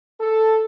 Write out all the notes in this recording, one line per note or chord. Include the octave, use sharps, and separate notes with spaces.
A4